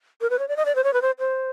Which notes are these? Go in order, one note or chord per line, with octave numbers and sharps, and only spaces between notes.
A#4
B4
C#5
D5
D#5
D5
C5
C#5
B4
C5
C5